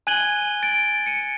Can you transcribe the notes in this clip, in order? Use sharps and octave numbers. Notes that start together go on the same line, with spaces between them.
G#5 F#6 G#6 D#7 F#7 G7
A6 D7
C#7 D#7